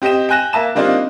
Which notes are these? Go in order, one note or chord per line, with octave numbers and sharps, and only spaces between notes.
C4 G4 D#5 G5 E7
G5 G#5 F#6 A#6 E7
A#3 E5 A5 E7
G3 A#3 C4 D4 D#4 F4